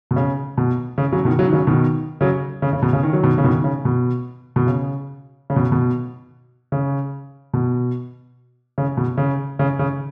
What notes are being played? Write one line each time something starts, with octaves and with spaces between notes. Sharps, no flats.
B2
C#3
B2
C#3
C#3 F#3
B2 D#3
C#3 F#3
D#3
C#3 F#3
B2 D#3
C#3 F#3
C#3
C#3
B2
C#3
D#3
F#3
B2 D#3
C#3
B2 D#3
C#3
B2
B2
C#3
C#3
B2
B2
C#3
B2
C#3
B2
C#3
C#3
C#3